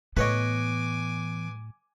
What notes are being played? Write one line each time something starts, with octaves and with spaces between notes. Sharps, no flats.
A2 E3 B3 B4 C#5 D#5 G#5 D6